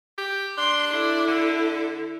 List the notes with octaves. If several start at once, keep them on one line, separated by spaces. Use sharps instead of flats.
G4
D4 C6
E4 A4
D3